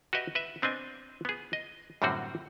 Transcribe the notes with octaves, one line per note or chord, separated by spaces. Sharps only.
F#4 G4 B4 D#5 E5
B4 E5
B3 C4 D4 D#5 G#5
B3 G#4
D#5
F#2 A2 D3 G3 C4 F#4